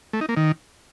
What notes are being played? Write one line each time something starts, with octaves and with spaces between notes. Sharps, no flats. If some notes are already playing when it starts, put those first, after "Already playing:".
A3
D#4
A#3
D#3